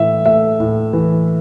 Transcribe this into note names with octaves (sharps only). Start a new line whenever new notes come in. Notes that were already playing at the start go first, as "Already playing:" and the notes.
Already playing: A2 E3 E5
A3 E5
A2
E3